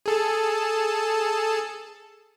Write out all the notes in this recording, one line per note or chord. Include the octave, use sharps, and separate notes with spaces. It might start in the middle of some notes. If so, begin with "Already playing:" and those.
G#4 A4 A5